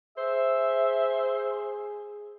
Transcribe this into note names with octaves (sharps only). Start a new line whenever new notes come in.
G#4 C5 E5